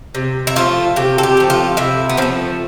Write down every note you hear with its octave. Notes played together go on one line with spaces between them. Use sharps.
C3
E4
F3 A3 F4
C3 G4
A4
G4
F3 A3
F4
C3 E4
B3
F3 A3 C4